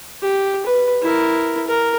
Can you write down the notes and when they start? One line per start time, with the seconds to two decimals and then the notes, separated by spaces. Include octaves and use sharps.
0.23 G4
0.66 B4
1.02 E4 A#4
1.67 A#4